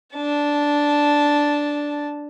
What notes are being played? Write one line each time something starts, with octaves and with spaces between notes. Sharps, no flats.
D4 A5